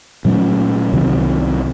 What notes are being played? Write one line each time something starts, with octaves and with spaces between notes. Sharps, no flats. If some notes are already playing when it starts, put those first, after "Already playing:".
A#2 F#3 A3 C#4
C2 C3 D#3 F#3